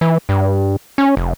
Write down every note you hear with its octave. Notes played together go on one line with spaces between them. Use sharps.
E3
G2
C#4
F1